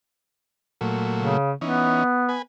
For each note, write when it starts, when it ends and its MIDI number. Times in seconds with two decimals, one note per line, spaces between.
0.81 1.37 46
0.81 1.37 54
0.81 1.37 57
1.18 1.52 49
1.61 2.04 52
1.61 2.39 59
1.61 2.04 61
1.61 2.04 63
2.29 2.42 71
2.29 2.42 80